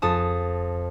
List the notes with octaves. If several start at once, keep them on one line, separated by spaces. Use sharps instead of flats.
F2 A5 D#6